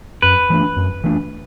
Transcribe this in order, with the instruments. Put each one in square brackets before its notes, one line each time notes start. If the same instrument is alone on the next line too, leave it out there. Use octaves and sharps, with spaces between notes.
[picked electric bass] F#2 [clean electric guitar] B4
[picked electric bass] E3 A3 D4
F#2
E3 A3 D4